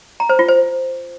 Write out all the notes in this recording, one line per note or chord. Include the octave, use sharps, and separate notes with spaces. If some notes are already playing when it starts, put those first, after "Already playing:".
A#5
C5
F4
C5